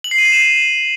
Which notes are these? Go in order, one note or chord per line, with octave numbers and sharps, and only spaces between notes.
F#7
C7
D#7
C7
E7